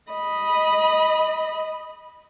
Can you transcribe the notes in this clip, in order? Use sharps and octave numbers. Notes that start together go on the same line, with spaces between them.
D#5 B5